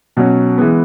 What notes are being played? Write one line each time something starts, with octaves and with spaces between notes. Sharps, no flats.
B2 F#3 C#4
E3 G#3 B3